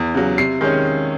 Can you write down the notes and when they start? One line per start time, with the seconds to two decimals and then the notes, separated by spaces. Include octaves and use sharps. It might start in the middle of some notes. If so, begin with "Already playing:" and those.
Already playing: E2
0.15 C#3 F#3
0.37 C3 C7
0.61 D#3 G#3 C#4